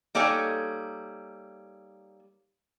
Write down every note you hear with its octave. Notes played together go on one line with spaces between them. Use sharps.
G3 A#3 D#4 A4 C#5 G#5